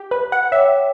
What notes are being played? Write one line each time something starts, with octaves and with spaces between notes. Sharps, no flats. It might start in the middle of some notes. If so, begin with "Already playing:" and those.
Already playing: G4
B4
F#5
C#5 E5 G5 D6